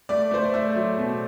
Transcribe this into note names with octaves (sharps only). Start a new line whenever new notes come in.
A3 D5
A3 C5
D5
A3 E5
F#3
B2